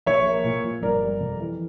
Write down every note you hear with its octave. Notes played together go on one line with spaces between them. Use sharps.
A#1 C#5 E5
A#3
A#2
F3
G1 A#4 D5
G3
F2
E3